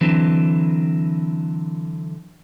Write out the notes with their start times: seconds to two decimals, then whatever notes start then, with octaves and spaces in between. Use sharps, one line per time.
0.01 D3 E3 F#3 C4